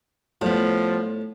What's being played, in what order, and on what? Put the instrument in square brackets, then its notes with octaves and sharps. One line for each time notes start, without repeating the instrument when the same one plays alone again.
[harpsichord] A2 [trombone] F3 [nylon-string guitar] G3 B3